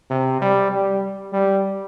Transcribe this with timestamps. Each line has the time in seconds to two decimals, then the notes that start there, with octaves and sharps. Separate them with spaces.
0.10 C3
0.41 G3
0.72 G3
1.33 G3